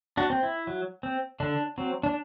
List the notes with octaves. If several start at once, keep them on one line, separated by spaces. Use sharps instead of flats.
D4 F#4
C4
E4
F#3
C4
D3 D4
F#3 C4
D4